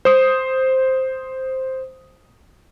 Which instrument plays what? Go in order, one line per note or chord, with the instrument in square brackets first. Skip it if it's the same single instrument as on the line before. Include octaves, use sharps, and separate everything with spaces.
[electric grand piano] C5 D#6